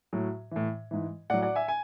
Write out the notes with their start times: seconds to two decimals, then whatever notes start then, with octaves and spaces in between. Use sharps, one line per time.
0.13 A2 F#3
0.51 A2 E3
0.91 G#2 E3
1.30 A2 F#3 D5 F#5
1.42 D5 F#5
1.56 E5 G#5
1.68 G#5